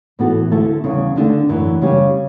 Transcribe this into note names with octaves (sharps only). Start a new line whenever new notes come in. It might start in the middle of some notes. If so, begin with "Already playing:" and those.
A2 E3 B3 F#4 A4
D2 D3 A3 E4 A4
E2 C#3 G3 C#4
D3 A3 D4 F#4 A4
F#2 E3 A3
C#3 G3 C#4 G4